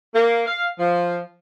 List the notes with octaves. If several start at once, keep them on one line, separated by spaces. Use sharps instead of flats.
A#3
F5
F3